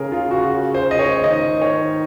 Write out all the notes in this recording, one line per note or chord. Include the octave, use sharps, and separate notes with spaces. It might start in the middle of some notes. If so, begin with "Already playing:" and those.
Already playing: C#3 G#4 A#4
F4
F#4
C5
D#5
C#5
D#3 D#5
C#5